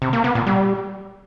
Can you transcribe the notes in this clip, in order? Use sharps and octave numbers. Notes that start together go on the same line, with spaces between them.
C3
A#3
B3
A#2
G3